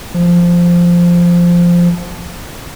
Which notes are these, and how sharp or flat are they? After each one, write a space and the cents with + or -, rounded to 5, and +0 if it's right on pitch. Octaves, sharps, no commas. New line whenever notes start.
F3 -5